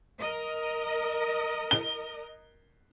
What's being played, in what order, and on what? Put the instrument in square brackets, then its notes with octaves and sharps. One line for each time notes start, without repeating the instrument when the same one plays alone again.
[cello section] A#4 D#5
[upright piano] G7